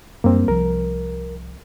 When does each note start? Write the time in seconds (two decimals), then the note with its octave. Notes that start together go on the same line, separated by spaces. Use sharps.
0.24 F#2 G3 A#3 C4 D4
0.48 C2 F3 A#4